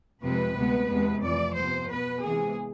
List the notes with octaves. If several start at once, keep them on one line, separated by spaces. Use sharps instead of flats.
F2 C3 G#3 C4 B4
D2 C3 G#3 B3
E2 C3 G#3 B3
F2 E3 A3 D5
C3 F3 B3 C5
B2 B3 B4
C3 E3 G#3 B3 G#4